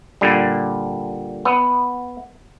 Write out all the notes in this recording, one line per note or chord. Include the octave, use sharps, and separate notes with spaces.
A#2 D3 G3
B3